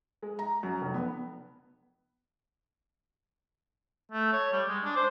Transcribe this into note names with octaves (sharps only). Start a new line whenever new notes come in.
G#3
A#5
F#2
F1
B3
A3
C#5
G3
G#3
D4
C5